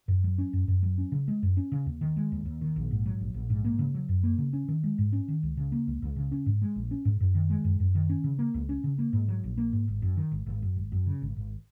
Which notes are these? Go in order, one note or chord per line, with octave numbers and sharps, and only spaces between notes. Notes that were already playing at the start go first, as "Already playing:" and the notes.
F#2
F#3
C#4
F#2
F#2
F#3
C#4
C#3
G#3
F#2
C#4
C#3
D#2
D#3
G#3
D#2
D#2
D#3
A#1
G#2
F#3
A#1
A#1
G#2
A#3
C#3
F#3
F#2
A#3
C#3
C#4
D#3
G#3
G#2
C#4
D#3
C#2
C#3
A#3
C#2
C#2
C#3
C#4
G#2
G#3
A#1
C#4
G#2
F#2
D#3
G#3
F#2
F#2
D#3
C#4
C#3
A#3
C#2
C#4
C#3
A#3
G#2
F#3
A#1
A#3
G#2
G#1
F#2
D#3
G#1
G#1
F#2
G#1
F#2
C#3
G#1
G#1